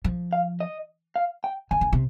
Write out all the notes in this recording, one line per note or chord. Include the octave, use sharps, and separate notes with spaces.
F3
F5
D#5
F5
G5
D#3 G#5
D3
C3